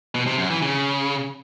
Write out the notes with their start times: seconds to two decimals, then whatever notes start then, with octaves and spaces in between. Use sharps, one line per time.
0.15 B2
0.27 C3
0.38 F#2
0.50 E3
0.62 C#3